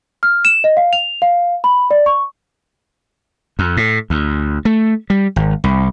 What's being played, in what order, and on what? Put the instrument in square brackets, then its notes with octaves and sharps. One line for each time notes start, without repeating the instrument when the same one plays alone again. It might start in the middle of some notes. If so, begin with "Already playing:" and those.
[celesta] F6
E7
D#5
F5
F7
F5
B5
D5
C#6
[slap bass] F2
A2
D2
A3
G3
G#1
C2